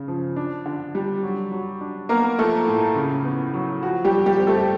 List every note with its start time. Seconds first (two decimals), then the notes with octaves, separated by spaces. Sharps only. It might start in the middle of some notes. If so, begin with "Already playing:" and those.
Already playing: C#3
0.08 F3
0.36 D4
0.66 D3
0.95 G3
1.23 F#3
1.52 F#3
1.81 D4
2.09 A#3 B3 A#4
2.39 F3 A3 A4
2.67 A2
2.96 C#3
3.25 B3
3.54 F#3
3.83 F3 F#4
4.04 G3 G4
4.11 F3
4.26 G3 G4
4.40 C4
4.47 A3 A4